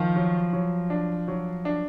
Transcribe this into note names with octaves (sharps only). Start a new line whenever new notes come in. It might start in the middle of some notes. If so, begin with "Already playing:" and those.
Already playing: D#3 F3
F#3
F#3
D4
F#3
D4